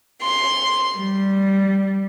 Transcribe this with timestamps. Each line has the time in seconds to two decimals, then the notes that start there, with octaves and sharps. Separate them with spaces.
0.22 C6
0.96 G3